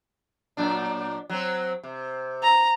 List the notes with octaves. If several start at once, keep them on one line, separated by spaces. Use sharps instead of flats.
A#2 F#3 D4
F#3 C4
C3
A#5